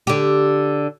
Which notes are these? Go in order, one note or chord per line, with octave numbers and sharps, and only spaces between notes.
D3 G4